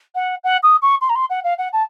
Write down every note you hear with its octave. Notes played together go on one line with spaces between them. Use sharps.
F#5
F#5
D#6
C#6
C6
A#5
C6
F#5
F5
F#5
A5